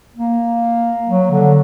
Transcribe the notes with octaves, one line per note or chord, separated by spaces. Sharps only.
A#3
F#3
D3